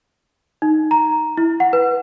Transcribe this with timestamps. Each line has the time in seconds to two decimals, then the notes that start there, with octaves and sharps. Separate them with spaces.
0.62 D#4
0.91 A#5
1.37 E4
1.60 F#5
1.73 B4